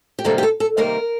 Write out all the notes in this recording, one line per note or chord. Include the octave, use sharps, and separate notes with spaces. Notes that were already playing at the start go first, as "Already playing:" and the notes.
G4
C3 D#3 G3 A#3 A4
G4
A4
A4
C3 D#3 G3 A#3 A#4